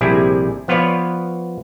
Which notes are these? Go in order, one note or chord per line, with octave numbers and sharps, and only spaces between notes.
A#1 C3 G3 E4 G#4 G#5
F3 B3 F4 B4 C#5 D5